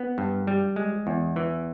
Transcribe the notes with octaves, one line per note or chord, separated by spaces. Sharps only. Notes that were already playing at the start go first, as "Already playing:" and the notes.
Already playing: B3
G2
G3
G#3
E2
E3